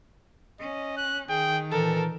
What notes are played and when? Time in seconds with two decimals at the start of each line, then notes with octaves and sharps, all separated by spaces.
0.60 C#4 D#5
0.97 F#6
1.29 D#3 G#4 G5
1.71 A#2 E3 A4 A#4 A5